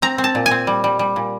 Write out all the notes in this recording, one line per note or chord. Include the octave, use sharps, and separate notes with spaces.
C4 A#5
C4
A5
A#2
G#5
C4
G3
G3
G3
A#2